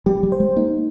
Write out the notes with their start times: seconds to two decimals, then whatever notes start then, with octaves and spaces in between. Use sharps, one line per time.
0.06 G3 G4
0.23 G3
0.32 C5
0.40 G#3
0.56 A#3 D#4